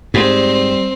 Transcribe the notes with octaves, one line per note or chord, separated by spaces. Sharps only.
G#2 G3 C4